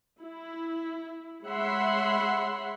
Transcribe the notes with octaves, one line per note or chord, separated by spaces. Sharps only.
E4
G#3 C#5 E5 F#5 B5 C6